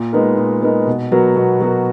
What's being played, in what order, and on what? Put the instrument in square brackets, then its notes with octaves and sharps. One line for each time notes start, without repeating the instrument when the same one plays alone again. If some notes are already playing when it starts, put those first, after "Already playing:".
Already playing: [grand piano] A#2
G#3 B3 D#4 A#4
A#2
G#3 B3 D#4 A#4
B2
F#3 B3 F#4 A#4
B2
F#3 B3 F#4 A#4